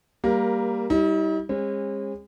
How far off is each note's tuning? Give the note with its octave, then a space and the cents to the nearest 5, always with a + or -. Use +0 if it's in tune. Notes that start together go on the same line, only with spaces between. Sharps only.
G3 +10 A#3 +0 A#4 +20
G3 -15 D#4 +45
G#3 -35 C#4 -45